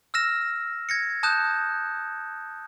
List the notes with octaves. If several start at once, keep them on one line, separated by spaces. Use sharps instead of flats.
E6 F6 A#6 E7
G#6 A#6 C#7
A5 D#6 F#6 G6 E7